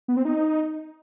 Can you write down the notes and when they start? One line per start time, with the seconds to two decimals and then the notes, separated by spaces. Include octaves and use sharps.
0.08 B3
0.17 C4
0.25 D#4